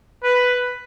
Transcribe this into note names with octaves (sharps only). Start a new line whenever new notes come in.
B4